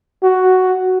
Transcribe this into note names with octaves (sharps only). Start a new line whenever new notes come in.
F#4